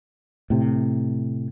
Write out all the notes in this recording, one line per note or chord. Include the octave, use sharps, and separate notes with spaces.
A2 C3